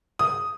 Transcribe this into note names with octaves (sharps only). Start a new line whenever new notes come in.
D#6